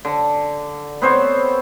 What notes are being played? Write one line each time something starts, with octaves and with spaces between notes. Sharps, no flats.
D3
B3 C4 C5 C#5